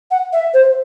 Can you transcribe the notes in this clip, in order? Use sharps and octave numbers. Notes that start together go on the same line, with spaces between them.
F#5
E5
C5